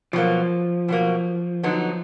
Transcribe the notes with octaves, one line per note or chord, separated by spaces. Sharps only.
B2 F3 F#3 A#3
B2 F#3 A#3
D3 F#3 B3 D#4